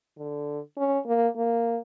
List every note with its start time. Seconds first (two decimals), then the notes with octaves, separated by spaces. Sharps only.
0.18 D3
0.78 C#4
1.07 A#3
1.37 A#3